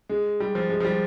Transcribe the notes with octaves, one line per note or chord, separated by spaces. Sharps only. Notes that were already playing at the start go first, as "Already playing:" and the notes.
G#3
G3
F3
G#3
F3
G3